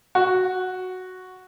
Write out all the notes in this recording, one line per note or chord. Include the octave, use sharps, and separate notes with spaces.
F#4